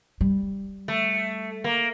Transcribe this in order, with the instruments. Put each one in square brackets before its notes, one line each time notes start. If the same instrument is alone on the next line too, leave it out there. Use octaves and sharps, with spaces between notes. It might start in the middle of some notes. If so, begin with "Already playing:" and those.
[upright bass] G3
[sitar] A3
A#3